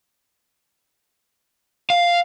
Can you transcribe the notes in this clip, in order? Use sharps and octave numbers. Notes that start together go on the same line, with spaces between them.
F5